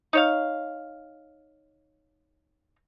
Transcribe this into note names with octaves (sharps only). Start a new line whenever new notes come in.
D#4 C#5 F5